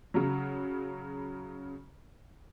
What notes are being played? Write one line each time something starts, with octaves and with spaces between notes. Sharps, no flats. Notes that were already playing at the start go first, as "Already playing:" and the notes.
C#3 F#3